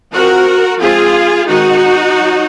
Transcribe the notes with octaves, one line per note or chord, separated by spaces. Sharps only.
F3 C4 F#4 A#4
F3 G#3 C4 F4 G#4
D#3 G#3 C4 D#4 F#4
F#3